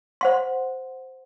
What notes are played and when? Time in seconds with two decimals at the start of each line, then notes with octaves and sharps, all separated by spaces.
0.21 C5 F#5 C6